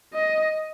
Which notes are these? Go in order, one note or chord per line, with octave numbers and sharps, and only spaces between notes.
D#5